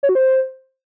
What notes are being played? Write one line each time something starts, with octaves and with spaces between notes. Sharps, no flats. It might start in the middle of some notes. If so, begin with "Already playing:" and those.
C#5
F#4
C5